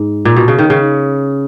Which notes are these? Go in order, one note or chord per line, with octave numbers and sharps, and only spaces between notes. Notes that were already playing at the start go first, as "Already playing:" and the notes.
Already playing: G#2
A#2
B2
C#3
D#3
C#3